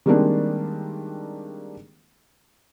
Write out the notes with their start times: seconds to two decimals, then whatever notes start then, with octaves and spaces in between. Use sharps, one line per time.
0.06 D#3 G3 G#3 A#3 C4 D4